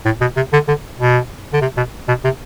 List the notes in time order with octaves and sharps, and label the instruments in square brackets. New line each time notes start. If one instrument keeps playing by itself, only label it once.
[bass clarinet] A2
B2
C3
D3
D3
B2
D3
C3
B2
B2
C3